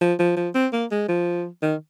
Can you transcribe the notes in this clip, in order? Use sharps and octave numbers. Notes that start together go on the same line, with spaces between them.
F3
F3
F3
C4
A#3
G#3
F3
D#3